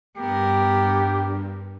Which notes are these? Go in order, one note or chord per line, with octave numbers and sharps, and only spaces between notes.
G2 B3 G4 A#4